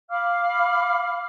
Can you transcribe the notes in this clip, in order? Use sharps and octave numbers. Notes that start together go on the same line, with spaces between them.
F5 B5 D6 F6